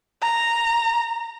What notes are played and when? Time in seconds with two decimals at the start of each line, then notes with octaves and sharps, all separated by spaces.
0.22 A#5